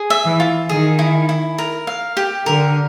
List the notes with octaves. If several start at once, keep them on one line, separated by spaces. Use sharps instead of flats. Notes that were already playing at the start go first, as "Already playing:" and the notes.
Already playing: G#4
E5
E3
F4
D#3 G#4
E4
E4
A#4
F5
G4
D3 A#4